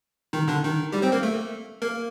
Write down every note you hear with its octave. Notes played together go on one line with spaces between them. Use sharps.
D#3 D#4
D3 D4
D#3 D#4
G3 G4
C4 C5
A#3 A#4
A3 A4
A#3 A#4